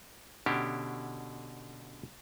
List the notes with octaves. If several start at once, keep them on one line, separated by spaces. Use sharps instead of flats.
B2 D3 C#4 D4 E4 G4